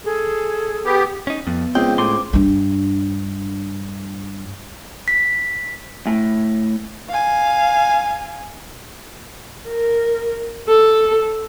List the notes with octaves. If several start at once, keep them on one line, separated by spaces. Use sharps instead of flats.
G#4 A4
B3 G4
C#4 D#4
F2 B3
C#2 C4 G5
A2 A3 C6 D6
G2 D4
B6
A2
F5 G#5
A#4
A4